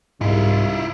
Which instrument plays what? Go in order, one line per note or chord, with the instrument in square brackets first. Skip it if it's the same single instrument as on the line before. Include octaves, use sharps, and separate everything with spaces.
[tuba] C2 [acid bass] G#2 [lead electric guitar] E4 F4